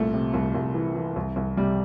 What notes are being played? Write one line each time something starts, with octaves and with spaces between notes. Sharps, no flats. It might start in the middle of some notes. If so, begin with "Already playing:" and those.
Already playing: C2 A#2 A3
C3
C2
C2
E3
E3
C2
C2
C3 G3